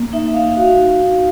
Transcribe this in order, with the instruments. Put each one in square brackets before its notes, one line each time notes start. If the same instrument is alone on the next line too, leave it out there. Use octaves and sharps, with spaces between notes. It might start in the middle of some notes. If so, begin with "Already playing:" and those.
Already playing: [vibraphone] A#3
D#4 E5
F5
F#4 F5
D#4